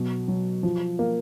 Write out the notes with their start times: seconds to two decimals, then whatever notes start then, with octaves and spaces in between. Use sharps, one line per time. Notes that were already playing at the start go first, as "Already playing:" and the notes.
Already playing: B2 F#3
0.28 F#3
0.63 F3
0.99 A#3